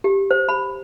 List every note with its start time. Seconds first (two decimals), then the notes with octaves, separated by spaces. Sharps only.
0.04 G4
0.31 C5
0.49 B5